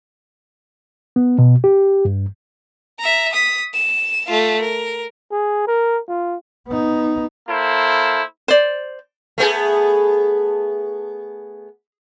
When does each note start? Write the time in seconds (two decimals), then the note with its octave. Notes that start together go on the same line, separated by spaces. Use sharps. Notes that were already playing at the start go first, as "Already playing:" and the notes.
1.16 B3
1.38 B2
1.64 G4
2.05 G2
2.99 E5 A#5
3.33 D#6 B6
3.74 E7
4.26 A3 F4
4.61 A#4
5.31 G#4
5.67 A#4
6.08 F4
6.67 B3 D#4
7.48 A#3 E4 A4 C5
8.48 C5 D5
9.38 A3 B3 G#4